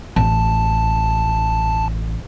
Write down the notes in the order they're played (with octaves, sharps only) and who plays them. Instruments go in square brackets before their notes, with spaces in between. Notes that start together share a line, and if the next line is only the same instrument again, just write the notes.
[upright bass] A1 [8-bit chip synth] A5